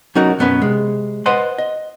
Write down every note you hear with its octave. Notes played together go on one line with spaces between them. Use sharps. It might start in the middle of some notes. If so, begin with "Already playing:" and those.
F#3 C#4 D#4 F#4 A#4 F#5
B1 F#2 B3 C#4 B4 C#5
C3 G#3
B4 C5 D#5 F#5 C6
D#5